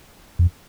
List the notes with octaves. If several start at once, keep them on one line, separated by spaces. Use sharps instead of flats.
F2